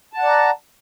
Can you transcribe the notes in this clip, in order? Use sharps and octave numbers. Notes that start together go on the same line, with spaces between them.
D5 F#5 A5 A#5